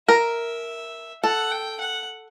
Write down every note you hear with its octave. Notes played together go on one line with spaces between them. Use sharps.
A#4 E5
A4 F#5
G5
F#5